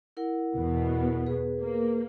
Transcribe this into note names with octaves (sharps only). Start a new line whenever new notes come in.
E4 A#4 F#5
E2 B2 B3
G#4 B4
A#3